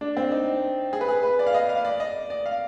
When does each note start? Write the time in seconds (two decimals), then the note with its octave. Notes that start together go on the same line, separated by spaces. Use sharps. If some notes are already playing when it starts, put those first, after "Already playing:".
0.01 D4
0.17 C4
0.32 D#4
0.93 G#4
1.01 B4
1.08 G#4
1.23 B4
1.39 D5
1.47 F5
1.54 D#5
1.69 F5
1.85 D5
2.00 D#5
2.30 D5
2.46 F5